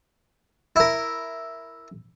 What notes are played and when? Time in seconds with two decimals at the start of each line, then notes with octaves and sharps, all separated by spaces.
0.76 E4 A#4